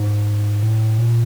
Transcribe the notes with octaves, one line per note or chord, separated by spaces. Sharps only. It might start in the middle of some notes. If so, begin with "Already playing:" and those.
Already playing: G#2
A2
A#2